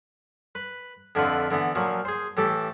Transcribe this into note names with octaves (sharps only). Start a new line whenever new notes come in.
B4
F2 D3 E4 F4 B4 F#5
D3 E3 B3
A#2 F3 F#3
G#4 C5
A2 E3 G4 A4